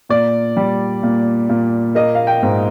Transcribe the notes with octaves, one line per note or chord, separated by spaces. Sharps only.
A#2 D5
G3
A#2
A#2
A#3 D#5
F5
G5
G#2